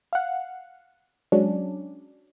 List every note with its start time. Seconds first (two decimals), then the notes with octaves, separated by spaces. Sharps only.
0.13 F5 F#5
1.32 F#3 G#3 C#4 D4